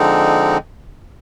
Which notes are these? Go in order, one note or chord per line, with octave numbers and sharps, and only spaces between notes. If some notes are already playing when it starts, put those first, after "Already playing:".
Already playing: D3 F3 G#3 C4 D#4